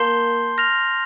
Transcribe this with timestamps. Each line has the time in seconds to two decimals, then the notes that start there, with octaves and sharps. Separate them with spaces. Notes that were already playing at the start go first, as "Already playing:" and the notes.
Already playing: A#3 A5 C6 G6 C7 G7
0.58 F6 A#6 F7